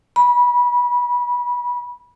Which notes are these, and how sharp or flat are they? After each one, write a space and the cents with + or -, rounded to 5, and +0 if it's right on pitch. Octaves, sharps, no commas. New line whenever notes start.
B5 -25